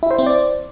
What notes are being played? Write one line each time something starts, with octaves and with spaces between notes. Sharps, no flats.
E4
C5
C4
D5